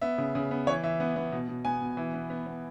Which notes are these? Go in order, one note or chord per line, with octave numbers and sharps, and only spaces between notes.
B3 E5
C#3
C#3
B3
E3 C#5
E3 E5
B3
B3
B2
B2
B3 G#5
B2
E3
B3
B3
B3